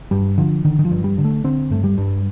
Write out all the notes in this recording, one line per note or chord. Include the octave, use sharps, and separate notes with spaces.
G2 G3
D3 F3
D3 D#3
D#3
F3
G2
G3
D3
A3
D3 C4
G2 A3
G3
G2